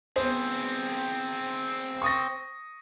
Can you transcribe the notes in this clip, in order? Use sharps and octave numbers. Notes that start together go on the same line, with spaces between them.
B3 C4 G#4 C5
C#6 D#6 A#6